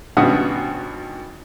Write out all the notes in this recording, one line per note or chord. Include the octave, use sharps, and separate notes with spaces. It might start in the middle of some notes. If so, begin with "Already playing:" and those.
G#1 G2 B2 C#4 F#5 D#6